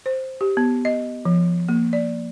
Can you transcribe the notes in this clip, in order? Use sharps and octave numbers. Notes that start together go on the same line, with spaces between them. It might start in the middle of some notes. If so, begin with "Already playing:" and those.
C5
G4
B3
D#5
F3
A#3
D5